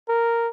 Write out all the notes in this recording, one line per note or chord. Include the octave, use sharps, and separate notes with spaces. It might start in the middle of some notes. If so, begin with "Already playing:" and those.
A#4